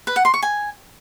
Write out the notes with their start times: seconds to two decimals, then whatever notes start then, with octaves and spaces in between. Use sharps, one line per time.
0.07 B4
0.16 F#5
0.25 C6
0.34 C#6
0.42 G#5